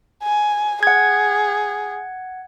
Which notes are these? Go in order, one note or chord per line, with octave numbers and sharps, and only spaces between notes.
G#5
G#4 F#5 G#6